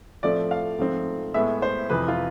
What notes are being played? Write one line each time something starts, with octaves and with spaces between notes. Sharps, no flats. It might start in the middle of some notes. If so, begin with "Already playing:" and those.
A2 F3 A3 C4 D5
F5
G#2 F3 A3 C4
A2 G#3 B3 E5
C5
F2 C3 E3 B4
F4